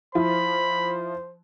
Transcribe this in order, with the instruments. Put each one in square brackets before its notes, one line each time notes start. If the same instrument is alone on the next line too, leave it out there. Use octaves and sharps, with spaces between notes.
[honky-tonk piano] F3 E4 [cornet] C5 [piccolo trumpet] B5